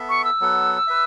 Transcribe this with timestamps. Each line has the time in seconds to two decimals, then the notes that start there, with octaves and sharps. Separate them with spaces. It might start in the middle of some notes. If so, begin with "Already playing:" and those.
Already playing: B3 A4 E5
0.09 C#6
0.25 E6
0.40 F#3 B3 A4 F#5
0.87 B4 E5